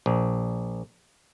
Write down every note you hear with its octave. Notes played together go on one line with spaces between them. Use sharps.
A#1